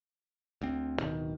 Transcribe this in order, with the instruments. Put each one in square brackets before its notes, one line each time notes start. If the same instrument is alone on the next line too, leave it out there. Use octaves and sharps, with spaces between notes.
[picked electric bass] D2 C4
D1 B2 D#3